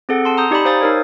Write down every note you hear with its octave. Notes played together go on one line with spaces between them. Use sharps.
C4 G#4 A4 F#5
A5 C6
A#5 D#6 G6
D#4 G4 D5 A#5 B5
D#4 C5 F5 G#5 D#6 A6
D#4 A#4 C#5